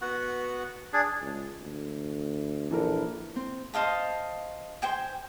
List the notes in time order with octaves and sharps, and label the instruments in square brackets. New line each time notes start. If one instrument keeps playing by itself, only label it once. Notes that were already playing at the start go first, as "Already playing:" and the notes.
[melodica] B3 F#4 F#5
D4 G#4
[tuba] C#2
D2
[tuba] A#1 [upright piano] E3 A4 A#4
[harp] C4
[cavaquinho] C5 D#5 F5 A5
C5 G5 G#5